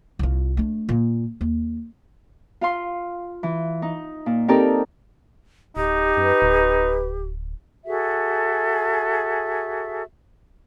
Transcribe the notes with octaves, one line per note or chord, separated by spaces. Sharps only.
C2 F4
A3 D4
A#2
D#2
F4 F5 C6
E3
D#4
A#2
C4 D#4 G4 A4 A#4 D5
D1 D#4 G4
F#2 B4
D1
F#4 G#4 A4 E5